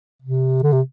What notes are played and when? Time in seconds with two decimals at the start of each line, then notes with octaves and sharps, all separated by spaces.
0.22 C3
0.63 D3
0.73 C3